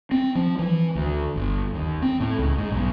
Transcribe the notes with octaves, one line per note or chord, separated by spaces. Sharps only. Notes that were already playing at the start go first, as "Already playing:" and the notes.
C4
F3
E3
D2
G1
D#2
C4
A2
C#2
G#2
B1